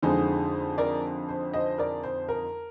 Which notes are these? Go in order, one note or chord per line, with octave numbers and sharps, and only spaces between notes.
F2 D3 G#3 D#4 C5
A#4 D5
C5
C5 D#5
A#4 D5
C5
A#4